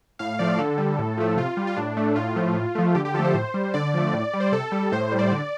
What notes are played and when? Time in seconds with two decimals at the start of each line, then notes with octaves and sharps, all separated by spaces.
0.19 A2 F5
0.39 F3 A3 D5
0.59 D3 A4
0.78 G3
0.99 A2
1.18 F3 A3
1.37 C3 F4
1.57 G3
1.67 F4
1.77 A2 D4
1.97 A3
2.16 A2 F4
2.36 F3 A3
2.55 A2
2.75 F3 A3
2.95 D3 G4
3.05 G4
3.14 F3 A4
3.19 A3
3.24 C5
3.34 A2
3.54 G3
3.74 D3 D5
3.94 F3 A3
4.13 A2
4.33 G3
4.40 C5
4.52 C3 A4
4.72 G3
4.92 A2 C5
5.12 G3
5.19 D5
5.31 D3